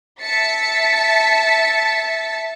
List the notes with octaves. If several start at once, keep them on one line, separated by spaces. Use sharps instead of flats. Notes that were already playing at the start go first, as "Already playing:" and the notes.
E5 A5 A6 B6 C#7